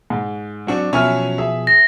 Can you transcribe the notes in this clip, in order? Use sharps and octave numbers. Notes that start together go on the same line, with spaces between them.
G#2
F#3 C4 D4 F#4
B2 F3 F#3 C#4 E5 G#5 F6
G#4 E5
A#6